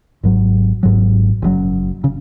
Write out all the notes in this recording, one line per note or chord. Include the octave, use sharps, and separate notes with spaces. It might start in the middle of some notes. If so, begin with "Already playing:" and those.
G#1 G#2 F#3
G#1 G#2 F#3
F#1 F#2 C#3 F#3
C#3